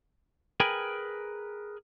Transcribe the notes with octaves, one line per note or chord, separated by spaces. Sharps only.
G#4 A#4 B4 G5 G#5